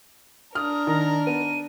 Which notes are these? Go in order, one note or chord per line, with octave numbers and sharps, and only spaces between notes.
D4 A#4 D#6 F6
D#3 A#5
B3 D#7